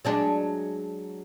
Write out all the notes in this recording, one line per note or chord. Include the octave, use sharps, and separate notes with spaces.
F#3 G#3 D4